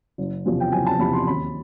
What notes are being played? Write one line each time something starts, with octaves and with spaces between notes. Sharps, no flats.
F#1
E2 C3 F3
G5
F#1 G#5
A5
E2 C3 F3 B5
C6
D#2 B5